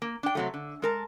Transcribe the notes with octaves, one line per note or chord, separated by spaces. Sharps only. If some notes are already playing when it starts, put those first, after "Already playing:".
A#3
D4 G5
C3 F#3 A3
D3
G#3 A#4 A5